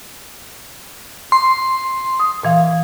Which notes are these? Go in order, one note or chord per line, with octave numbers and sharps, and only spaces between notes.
C6
D#6
A#2 E3 F5